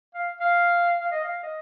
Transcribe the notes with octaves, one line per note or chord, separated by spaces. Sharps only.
F5
F5
F5
D#5
F5
D#5